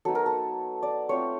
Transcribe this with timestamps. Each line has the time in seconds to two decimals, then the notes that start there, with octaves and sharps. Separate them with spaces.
0.05 F#3 B3 D#4 A4
0.15 A#4
0.26 A4
0.83 D5
1.09 A3 C4 F4 C#5